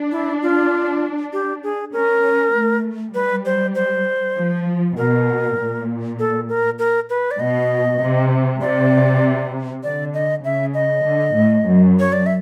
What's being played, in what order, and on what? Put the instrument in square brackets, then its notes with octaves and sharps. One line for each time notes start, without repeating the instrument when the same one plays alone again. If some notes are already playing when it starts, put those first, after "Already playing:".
Already playing: [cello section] D4
[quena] E4
F4
G4
G#4
[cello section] C#4 [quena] A#4
[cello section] C#4
A3
[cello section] G3 [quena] B4
[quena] C5
C5
[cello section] F3
[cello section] B2 [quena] A#4
[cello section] A#2
[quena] A4
A#4
A#4
B4
D5
[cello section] B2 [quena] D#5
[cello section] C3
[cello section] C3 [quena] D5
[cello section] D3 [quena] D5
[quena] D#5
[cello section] C#3 [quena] E5
[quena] D#5
[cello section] D3
A2
F#2
[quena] C#5
D5
E5